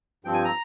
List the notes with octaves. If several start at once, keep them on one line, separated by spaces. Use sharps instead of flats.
G2 F3 C4 G5
G#5
A#5